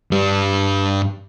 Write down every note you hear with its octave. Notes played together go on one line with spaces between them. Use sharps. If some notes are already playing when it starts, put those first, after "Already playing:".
G2 G3